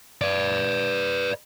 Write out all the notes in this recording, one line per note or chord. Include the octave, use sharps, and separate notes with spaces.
B4 D5